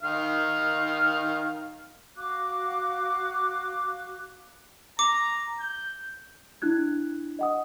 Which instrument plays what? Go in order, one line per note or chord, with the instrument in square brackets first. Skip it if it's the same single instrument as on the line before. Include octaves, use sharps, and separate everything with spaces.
[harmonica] D#3 F5 F6
[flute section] F#4 F5 D6 F#6
[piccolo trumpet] A#5 [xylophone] D6
[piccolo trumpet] G6
[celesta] D4 E4 F#6 G#6
D#5 F#5 D#6